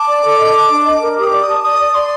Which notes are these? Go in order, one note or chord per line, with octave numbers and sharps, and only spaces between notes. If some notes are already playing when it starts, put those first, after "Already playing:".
Already playing: A5 D6
D5
A4
D#5
A5
D4
D#5
A#4
G4 D#6
D6
D5
A5 D#6
D5 D#6
D5
D5 C6